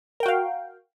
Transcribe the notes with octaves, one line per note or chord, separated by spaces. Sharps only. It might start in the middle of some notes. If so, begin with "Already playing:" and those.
F#4 A#4 F5 G5